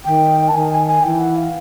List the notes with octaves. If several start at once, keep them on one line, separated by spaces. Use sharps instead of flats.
D#3 G5
A5
D#3 G#5
G#5
G#5
E3 G5
F#5
F5